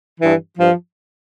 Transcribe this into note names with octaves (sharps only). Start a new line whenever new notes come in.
G2 E3
G2 F3